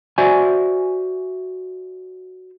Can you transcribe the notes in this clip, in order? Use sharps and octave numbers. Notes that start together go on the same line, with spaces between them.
F#4 C5 D5 E5 G#5